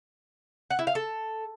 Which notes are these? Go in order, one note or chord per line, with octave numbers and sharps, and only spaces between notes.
F#5
E4
F5
A4